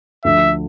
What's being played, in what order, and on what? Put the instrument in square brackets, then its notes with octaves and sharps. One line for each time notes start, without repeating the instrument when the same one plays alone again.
[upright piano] D2 D3 F3 [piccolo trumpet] E5